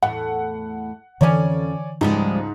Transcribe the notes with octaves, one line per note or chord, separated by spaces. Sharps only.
E2 A2 F#5
F2 D3 E3 C#4 C#5 D5 G#5
C#2 G#2 F3 G3 G#3